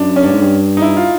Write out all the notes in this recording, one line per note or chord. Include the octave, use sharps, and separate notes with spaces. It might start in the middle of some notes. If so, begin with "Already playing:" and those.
Already playing: F#2 D4
C#4
G2 D4
G#2
G2
D#4
E4
F4